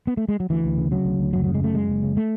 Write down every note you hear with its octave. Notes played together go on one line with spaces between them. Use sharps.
B3
A3
G#3
F#3
D2 E3
D2
C#3
C#3 F#3
D2
D2
F#1 F#3
C#3 F#3
G#3
F#2 A3
F#1 G#3
F#1
C#3
A3